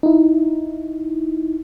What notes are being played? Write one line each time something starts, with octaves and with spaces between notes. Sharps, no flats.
D#4 E4